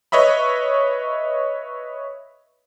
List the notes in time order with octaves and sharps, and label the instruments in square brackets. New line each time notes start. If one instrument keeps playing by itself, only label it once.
[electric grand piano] B4 C#5 D#5 E5 B5